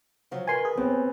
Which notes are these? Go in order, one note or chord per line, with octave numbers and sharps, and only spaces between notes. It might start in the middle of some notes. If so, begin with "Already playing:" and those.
C#3 F3 F#3
D#3 A#4 B4 G#5 C6
G#4
D#2 B3 C4